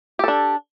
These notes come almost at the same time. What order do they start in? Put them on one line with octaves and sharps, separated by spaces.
G4 A4 D4